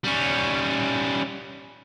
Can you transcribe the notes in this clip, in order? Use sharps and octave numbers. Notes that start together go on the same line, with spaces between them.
G3 C#4